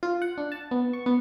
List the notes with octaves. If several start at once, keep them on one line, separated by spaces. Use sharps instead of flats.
F4
F#5
D4
A5
B3
C#6
B3